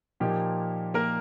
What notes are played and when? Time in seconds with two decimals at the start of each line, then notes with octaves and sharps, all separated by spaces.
0.20 A#2 F3 A#3 D#4 G4
0.94 A#3 A#4